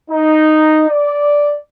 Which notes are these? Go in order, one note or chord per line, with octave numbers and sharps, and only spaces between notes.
D#4
D5